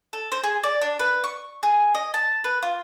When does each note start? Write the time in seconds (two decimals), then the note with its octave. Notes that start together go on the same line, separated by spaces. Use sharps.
0.13 A4
0.32 C5
0.44 G#4
0.63 D5
0.82 D4
0.99 B4
1.24 C#6
1.63 G#4
1.95 D#5
2.14 A5
2.44 B4
2.63 F4